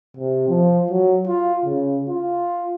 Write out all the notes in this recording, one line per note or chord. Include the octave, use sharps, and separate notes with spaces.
C3
F3
F#3
F4
C#3
F4